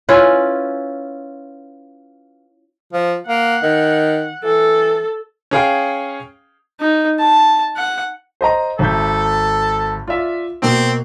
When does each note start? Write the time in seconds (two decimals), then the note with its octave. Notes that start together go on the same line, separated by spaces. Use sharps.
0.09 C#4 E4 F4 B4
2.93 F3
3.28 A#3 F#5
3.63 D#3
4.43 E3 A4
5.51 C#4 G#4 F5 G5
6.80 D#4
7.19 A5
7.77 F#5
8.41 C5 D#5 A#5
8.79 G#1 A4 E5 G6
10.08 F4 D5 E5
10.62 B2 A#3 C4